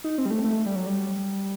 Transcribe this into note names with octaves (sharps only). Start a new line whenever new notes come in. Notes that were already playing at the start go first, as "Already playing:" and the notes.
D#4
C4
G3
A3
A3
G3
F#3
G3